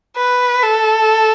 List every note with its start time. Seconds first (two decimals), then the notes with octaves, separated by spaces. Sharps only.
0.17 B4
0.63 A4